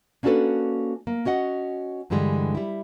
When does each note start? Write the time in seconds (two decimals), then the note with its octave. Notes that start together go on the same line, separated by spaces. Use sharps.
0.23 A#3 C#4 D4 F#4 A4 B4
1.07 A#3
1.25 C#4 F#4 D#5 F#5
2.10 G2 D3 E3 G3 G#3
2.55 G3 E4